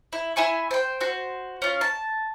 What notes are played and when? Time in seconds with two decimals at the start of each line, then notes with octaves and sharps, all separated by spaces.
0.13 E4
0.36 E4 E5 G#5 C#6
0.71 C5 G5
1.00 F#4 C5
1.62 C#4 F4
1.81 A5